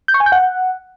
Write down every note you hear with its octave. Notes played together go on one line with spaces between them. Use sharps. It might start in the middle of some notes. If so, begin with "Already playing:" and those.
G6
C#6
G#5
G6
F#5